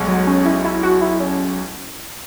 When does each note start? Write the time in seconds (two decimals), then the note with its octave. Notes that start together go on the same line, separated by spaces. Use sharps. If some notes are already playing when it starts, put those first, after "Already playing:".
Already playing: B1 B2 G#3
0.08 F#3
0.27 C#4
0.45 E4
0.65 E4
0.83 F#4
1.01 E4
1.20 C#4